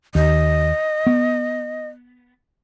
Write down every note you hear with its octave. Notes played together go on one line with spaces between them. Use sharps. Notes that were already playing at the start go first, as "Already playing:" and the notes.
D#2 D#5
B3